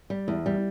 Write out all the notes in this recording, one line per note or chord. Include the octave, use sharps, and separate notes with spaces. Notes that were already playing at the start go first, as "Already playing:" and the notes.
G3
E2
G3